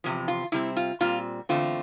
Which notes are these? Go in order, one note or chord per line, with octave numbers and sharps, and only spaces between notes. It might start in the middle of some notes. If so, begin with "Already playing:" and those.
E2 C3 F3
F4
C3 G3 C4 E4
F4
A#2 G3 C4 F4
E2 D3 A3 C4 F4